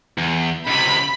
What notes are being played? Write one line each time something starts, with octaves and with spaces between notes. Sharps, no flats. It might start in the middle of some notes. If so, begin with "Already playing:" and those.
E2
C#2 C3 B5